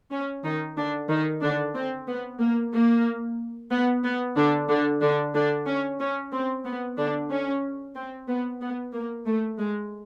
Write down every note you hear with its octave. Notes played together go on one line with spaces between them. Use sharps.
C#4
D#3 D#4
D3 D4
D#3 D#4
D3 D4
C4
B3
A#3
A#3
B3
B3
D3 D4
D3 D4
D3 D4
D3 D4
C#4
C#4
C4
B3
D3 D4
C#4
C4
B3
B3
A#3
A3
G#3